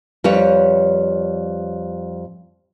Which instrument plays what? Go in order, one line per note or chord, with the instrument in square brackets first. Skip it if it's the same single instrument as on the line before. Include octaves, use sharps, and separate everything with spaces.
[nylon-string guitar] F2 G3 B4 C#5